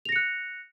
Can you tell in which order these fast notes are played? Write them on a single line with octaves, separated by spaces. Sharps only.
F7 A#6 C#7 F#6